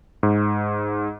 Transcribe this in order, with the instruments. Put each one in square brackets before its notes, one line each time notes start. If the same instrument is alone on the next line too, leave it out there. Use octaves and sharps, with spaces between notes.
[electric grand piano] G#2